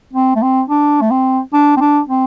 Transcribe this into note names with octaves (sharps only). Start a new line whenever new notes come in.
C4
A3
C4
D4
A3
C4
D4
C4
D4
C4